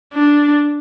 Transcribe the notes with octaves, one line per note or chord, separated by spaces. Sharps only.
D4